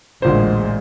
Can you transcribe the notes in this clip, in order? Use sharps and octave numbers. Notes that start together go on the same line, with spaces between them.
A1 D2 A#2 G#3 C5